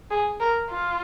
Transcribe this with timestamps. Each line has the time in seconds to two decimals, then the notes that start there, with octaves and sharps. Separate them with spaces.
0.11 G#4
0.40 A#4
0.70 F4